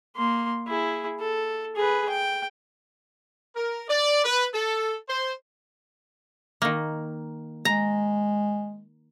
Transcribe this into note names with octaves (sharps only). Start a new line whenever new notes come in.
A#3 C6
E4 G#4
A4
G#4 B4
G5
A#4
D5
B4
A4
C5
D#3 A#3
G#3 A#5